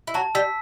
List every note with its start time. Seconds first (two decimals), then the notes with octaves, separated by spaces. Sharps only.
0.07 E4
0.14 F#3 F#4 A5
0.35 G3 G4 E6 B6